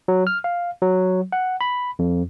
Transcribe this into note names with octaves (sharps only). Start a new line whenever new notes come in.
F#3
F6
F5
F#3
F#5
B5
F2